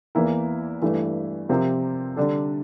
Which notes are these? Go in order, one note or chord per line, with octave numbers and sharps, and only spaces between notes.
E2 E3 A#3 E4 A#4
G2 E3 A3 E4
C3 F3 C4 G4 A#4
D3 G3 D4 A4